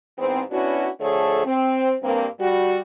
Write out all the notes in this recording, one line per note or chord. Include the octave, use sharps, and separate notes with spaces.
E2 G#2 B3 C4
B3 C#4 D4 E4 F#4
D3 F3 A3 G#4 A4 C#5
C4
G2 A#3 C4
G3 F#4